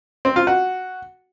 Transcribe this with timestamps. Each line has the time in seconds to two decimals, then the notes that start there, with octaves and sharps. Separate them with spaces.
0.25 C4
0.36 F4
0.47 F#4